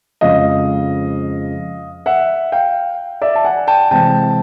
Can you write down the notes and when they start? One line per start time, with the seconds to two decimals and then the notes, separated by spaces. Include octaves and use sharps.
0.21 F2 C#3 F3 G#3 D#5 F5
2.06 E5 F#5
2.52 F5 G5
3.22 D5 E5
3.35 A5
3.45 F#5 G#5
3.68 G5 A5
3.91 C3 E3 G#3 C4 G5 A5